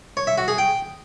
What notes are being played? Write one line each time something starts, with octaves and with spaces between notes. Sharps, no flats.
C#5
E5
F#4
G#4
G5